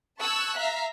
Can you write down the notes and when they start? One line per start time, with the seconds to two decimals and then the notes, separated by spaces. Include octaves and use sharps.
0.19 A5 C#6 E6 F#6 G#6
0.58 E5 F5 A#5 B6